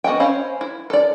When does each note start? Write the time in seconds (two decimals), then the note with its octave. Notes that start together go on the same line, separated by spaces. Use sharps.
0.04 B3 F#4 D#5 E5 G5
0.20 C#4 C5 C#5 F5 B5
0.61 E4
0.90 A4 D5